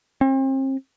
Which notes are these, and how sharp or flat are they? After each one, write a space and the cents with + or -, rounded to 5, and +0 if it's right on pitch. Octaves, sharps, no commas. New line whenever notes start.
C4 +40